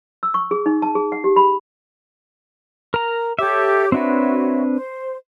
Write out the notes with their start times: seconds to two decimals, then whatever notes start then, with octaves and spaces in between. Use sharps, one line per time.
0.23 E6
0.34 C#6
0.51 G#4
0.66 D#4
0.82 A5
0.95 G#4
1.12 F#5
1.24 G4
1.36 B5
2.94 A#4 A#5
3.39 G4 A4 C#5 E5 D6
3.92 C4 D4 F#4 B4 C#5 E5
4.75 C5